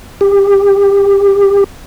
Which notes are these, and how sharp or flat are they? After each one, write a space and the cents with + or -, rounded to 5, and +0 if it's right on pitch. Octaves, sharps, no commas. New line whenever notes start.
G4 +25